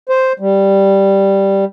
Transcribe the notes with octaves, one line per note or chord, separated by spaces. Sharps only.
C5
G3